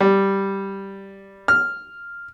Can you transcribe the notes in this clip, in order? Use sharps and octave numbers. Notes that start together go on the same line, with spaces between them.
G3
F6